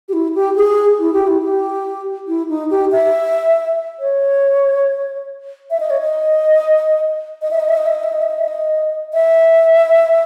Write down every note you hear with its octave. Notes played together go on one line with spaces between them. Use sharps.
G4
E4
G4
G#4
E4
G4
E4
G4
E4
D#4
G4
E5
C#5
E5
D#5
C#5
D#5
D#5
E5
D#5
E5
D#5
E5
D#5
E5
D#5
E5
D#5
E5
D#5
E5